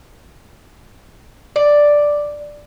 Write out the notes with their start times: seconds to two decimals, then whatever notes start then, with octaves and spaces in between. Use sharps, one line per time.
1.56 D5